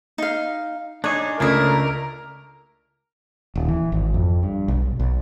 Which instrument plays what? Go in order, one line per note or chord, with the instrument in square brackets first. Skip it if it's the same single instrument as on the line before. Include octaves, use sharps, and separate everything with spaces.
[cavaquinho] D#4 F5
[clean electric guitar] D4 D#4 G#4 [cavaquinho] C#5
[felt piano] C#2 [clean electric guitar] A3 D4 E4 [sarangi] A#4 [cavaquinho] C#5 D#5
[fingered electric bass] D#1
E3
G#1
F2
G2
B1
B1